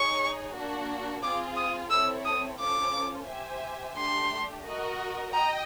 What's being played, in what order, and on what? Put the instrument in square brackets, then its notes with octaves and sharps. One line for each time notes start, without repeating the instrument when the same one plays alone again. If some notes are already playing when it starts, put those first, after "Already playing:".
Already playing: [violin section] D#4 G#4 C#5 [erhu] C#6
[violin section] A#3 D4 F#4
[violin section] C4 F4 G#4 [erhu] D6
[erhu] D#6
[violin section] C4 E4 A4 C#5 [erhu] E6
[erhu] D#6
[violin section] C#4 F4 A4 C5 [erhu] D6
[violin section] G4 C5 E5 G#5
[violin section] A3 D4 G4 [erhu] C6
[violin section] F#4 A#4 D#5
[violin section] D#5 G5 [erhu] A#5